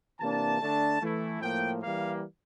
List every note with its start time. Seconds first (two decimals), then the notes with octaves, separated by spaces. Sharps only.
0.20 C3 E3 A#3 D4 A5
0.60 D3 A3 D4
1.01 E3 A3 E4
1.41 A2 F3 A#3 G5
1.82 E3 G3 A#3 F5